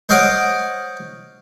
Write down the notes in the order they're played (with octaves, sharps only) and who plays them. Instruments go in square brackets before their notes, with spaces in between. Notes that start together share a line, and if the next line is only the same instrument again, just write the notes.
[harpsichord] C5 C#5 D#5 F5 F#5 D6